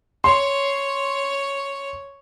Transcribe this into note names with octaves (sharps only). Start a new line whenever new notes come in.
C#5 C6